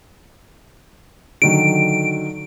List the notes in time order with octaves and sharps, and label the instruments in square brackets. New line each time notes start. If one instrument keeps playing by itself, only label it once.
[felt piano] D3 D#3 F#3 [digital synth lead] D7